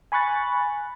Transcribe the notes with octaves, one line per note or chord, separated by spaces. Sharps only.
G#5 B5 C#6 F#6 A6